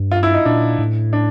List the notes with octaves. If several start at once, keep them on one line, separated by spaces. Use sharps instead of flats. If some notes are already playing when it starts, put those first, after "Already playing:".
Already playing: G2
F4
E4
D#4
A#2 D4
A2
D4